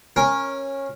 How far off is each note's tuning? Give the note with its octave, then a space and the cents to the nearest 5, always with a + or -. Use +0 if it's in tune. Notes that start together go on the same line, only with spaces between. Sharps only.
C#4 -15 A#4 +0